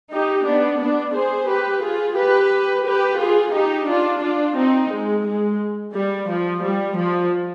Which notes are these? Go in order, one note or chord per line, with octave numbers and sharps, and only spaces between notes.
D#4 G4
B3 D4
B3 D4
G#4 C5
G4 B4
F4 G#4
G4 B4
G4 B4
F4 G#4
D#4 G4
D4 F4
D4 F4
C4 D#4
G#3
G#3
G3
F3
G3
F3